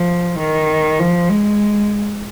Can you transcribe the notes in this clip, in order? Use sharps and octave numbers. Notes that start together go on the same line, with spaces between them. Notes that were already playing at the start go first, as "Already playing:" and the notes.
Already playing: F3
D#3
F3
G#3